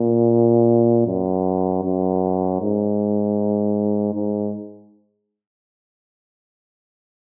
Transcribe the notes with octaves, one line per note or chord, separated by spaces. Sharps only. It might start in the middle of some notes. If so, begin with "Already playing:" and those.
Already playing: A#2
F#2
F#2
G#2
G#2